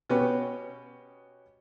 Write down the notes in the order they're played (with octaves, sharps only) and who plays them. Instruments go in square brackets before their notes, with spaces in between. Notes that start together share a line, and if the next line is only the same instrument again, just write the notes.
[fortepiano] B2 B3 C#4 G4 B4